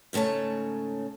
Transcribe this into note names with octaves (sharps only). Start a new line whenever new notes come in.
G#2 C#3 A3 C#5 A5